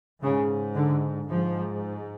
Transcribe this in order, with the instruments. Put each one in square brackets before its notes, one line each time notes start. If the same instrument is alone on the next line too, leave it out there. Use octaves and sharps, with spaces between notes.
[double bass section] G#2 C#3
D3
G#2 F3